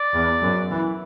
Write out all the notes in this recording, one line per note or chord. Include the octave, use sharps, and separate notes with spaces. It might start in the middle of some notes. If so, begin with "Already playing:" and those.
Already playing: D5
E2
F#2
E3